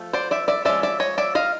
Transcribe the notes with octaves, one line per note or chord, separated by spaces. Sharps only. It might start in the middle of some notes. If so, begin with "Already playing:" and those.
Already playing: F3 A3
C5 D5
D5 E5
D5 E5
F3 G#3 C#4 D5 E5
D5 E5
C#5 D#5
D5 E5
D#5 F5